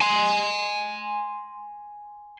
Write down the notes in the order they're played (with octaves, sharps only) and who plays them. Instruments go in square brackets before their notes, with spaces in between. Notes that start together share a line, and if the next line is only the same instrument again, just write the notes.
[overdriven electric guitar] G#5 C6